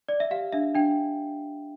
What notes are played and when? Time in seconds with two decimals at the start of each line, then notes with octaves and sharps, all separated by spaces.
0.09 D5
0.20 E5
0.31 G4 F5
0.53 D4 E5
0.75 D4 G5